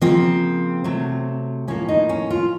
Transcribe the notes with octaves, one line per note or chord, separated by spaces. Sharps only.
C#3 F3 A#3 C4
C3 F#3 A3
A2 F3 A#3 C#4
D#4
C#4
F4